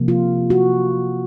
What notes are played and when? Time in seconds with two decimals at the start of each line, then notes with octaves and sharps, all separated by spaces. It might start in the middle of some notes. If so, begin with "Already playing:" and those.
Already playing: C3 F3 A#3
0.08 F4
0.50 F#4